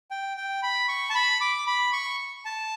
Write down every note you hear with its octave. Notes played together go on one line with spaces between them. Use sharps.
G5
G5
B5
C#6
A5
B5
D6
B5
C#6
A5